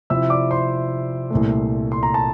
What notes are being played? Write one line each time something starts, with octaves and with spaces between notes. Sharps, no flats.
C3 F3 C4 E4 E5 E6
D5 D6
C5 C6
C2 A#2 A3
C6
A#5
A5